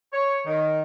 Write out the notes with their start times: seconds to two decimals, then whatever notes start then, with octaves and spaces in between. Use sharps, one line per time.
0.12 C#5
0.46 D#3